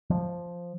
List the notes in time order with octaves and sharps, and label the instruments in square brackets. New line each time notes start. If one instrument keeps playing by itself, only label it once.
[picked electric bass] F3